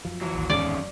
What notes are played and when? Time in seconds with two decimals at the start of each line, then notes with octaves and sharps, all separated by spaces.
0.05 F#2 F3
0.21 E3 F#3
0.34 A1 D#2
0.50 D1 E2 G#2 D#3 C#4 D5
0.77 F#2